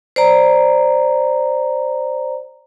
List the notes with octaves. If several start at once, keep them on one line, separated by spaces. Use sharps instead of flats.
C5 D5 A#5